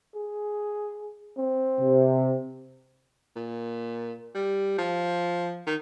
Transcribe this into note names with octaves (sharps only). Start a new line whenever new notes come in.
G#4
C4
C3
A#2
G3
F3
D#3